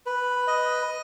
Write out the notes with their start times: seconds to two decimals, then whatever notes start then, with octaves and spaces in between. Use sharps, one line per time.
0.06 B4
0.47 D#5